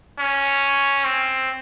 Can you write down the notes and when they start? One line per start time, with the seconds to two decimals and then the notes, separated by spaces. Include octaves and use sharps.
0.19 C#4
1.05 C4